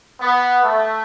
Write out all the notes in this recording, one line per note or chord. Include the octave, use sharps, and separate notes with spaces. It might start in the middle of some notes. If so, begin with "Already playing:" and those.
B3
A3